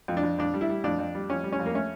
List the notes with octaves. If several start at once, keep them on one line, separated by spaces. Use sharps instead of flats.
F2
D4
F2
F2 D4
G3
E4
G3
F2 D4
F2
G3
F2 C#4
G3
C#4
F2
A#3
A3 C#4